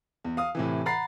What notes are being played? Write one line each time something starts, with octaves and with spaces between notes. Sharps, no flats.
E2
F5 D#6
A2 C3 E3
F#5 A#5 B5 A6 C7